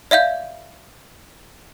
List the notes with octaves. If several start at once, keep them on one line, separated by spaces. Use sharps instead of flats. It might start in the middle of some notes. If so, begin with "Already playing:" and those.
D5 E5 F5 G6